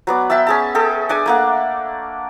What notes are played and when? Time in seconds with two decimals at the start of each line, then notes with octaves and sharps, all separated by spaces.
0.07 F#3 B3 D5
0.30 E5 G5 A5 E6
0.47 C#4 G#4 A5
0.75 G#4 A4 G5
1.09 D4 D5 G#5
1.26 A3 A#3 F#5